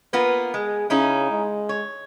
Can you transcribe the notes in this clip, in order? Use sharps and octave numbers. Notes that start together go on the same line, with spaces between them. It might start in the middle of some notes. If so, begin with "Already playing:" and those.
A#3 B3 F4 B4
G#3 G#4
C#3 C#4 D#4 E4
G#3
C#5